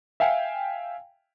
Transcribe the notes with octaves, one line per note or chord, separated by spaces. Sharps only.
E5 F5 G5 G#5